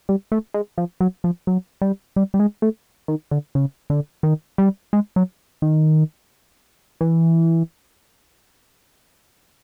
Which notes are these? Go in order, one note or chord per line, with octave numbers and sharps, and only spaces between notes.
G3
A3
G#3
F3
F#3
F3
F#3
G3
G3
G3
G#3
A3
D#3
D3
C#3
D3
D#3
G3
G#3
F#3
D#3
E3